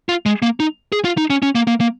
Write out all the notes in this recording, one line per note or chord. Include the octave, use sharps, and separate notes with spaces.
F4
G#3
A#3
D#4
G#4
F4
D#4
C#4
C#4
A#3
A#3
A#3